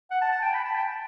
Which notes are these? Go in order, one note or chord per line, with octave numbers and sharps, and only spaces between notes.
F#5
A5
A5
G5
B5
A5
G5